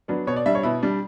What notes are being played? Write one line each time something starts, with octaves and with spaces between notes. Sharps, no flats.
F#3 B3 D4
B2 C#5
D5
G3 D4 E5
C#5
B2 E4
G3 D4